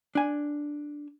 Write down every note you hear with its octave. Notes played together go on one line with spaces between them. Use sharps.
D4 G#5